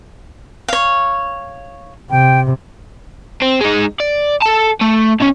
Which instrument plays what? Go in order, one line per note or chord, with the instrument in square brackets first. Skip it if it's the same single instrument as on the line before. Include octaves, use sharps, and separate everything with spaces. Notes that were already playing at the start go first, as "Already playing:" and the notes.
[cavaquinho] C#5 F5
[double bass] C3 [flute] G5
[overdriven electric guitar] C4
G#3 D#4
D5
A4 A5
A3
B2 C#4